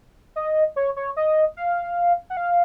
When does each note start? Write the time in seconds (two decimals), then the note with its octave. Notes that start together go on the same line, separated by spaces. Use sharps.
0.36 D#5
0.76 C#5
0.96 C#5
1.17 D#5
1.57 F5
2.30 F#5
2.37 F5